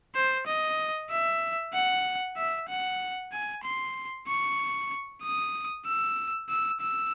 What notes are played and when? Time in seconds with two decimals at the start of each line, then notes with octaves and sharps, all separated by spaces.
0.15 C5
0.47 D#5
1.11 E5
1.74 F#5
2.37 E5
2.69 F#5
3.32 G#5
3.64 C6
4.27 C#6
5.23 D#6
5.86 E6
6.49 E6
6.81 E6